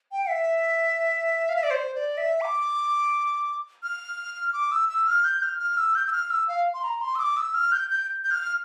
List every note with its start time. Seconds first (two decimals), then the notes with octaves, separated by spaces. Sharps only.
0.12 G5
0.29 E5
1.49 F5
1.56 E5
1.63 D5
1.71 C5
1.95 D5
2.17 E5
2.41 D6
3.83 F6
4.53 D6
4.72 E6
4.89 E6
5.07 F6
5.24 G6
5.42 F6
5.59 F6
5.77 E6
5.95 G6
6.07 E6
6.12 F6
6.31 E6
6.48 F5
6.74 C6
6.84 A#5
7.01 C6
7.15 E6
7.19 D6
7.37 E6
7.55 F6
7.72 G6
7.90 G6
8.24 G6
8.31 F6